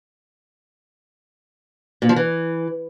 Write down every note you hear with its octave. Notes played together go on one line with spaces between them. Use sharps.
A#2
F3
E3